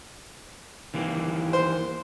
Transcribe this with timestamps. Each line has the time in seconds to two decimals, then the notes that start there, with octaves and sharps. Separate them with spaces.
0.94 D#3 E3 A#3
1.53 C5